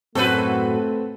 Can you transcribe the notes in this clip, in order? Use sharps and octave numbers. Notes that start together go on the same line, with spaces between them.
F#2 A2 A3 C4 F#4 A4 B4 G6